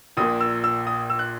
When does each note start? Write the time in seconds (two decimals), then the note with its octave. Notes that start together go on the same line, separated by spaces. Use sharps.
0.17 A#1 A#2 A#3 D#6
0.40 E6
0.64 E6
0.87 D#6
1.10 E6
1.19 F#6